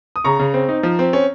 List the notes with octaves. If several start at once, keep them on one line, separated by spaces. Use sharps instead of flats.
D#6
C#3 A#5 C#6
C#3
C4
D#4
F3
C4
C#4